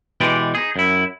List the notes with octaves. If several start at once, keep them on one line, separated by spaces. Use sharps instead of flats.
B2 E3 G#3 G4 D5
D#4 G#4
F#2 E4